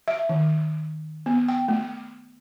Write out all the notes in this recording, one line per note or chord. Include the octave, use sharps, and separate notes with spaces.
E5
D#3
B3
G5
A3